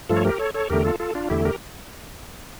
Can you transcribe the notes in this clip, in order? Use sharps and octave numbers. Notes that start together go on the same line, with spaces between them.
G2 F3 A3 F4 A4
C#5
G4 A#4
A4 C#5
A4 C#5
E2 D3 A3 G4 A#4
F4 A4
F4 A4
D4 F4
E2 D3 A3 E4 G4
G4 A#4